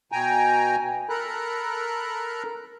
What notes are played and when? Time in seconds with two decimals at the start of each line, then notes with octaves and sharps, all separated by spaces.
0.12 B2 G5 G#5 A#5
1.09 A4 A#4 A#5 B5 F#6